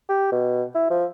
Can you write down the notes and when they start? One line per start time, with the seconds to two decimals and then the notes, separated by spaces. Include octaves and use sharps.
0.09 G4
0.32 B2
0.75 E4
0.90 F3